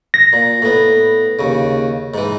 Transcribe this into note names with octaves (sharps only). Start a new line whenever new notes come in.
A#6
A#2
A2 B3
D#2 C#3
G#2 E3